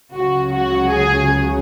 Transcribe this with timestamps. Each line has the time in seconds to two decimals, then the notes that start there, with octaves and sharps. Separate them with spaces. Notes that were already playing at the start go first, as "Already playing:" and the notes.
0.14 C#2 C#3 F#3 F#4
0.54 F#4
0.93 G#4